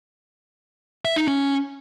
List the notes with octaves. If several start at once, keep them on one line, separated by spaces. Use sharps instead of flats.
E5
D#4
C#4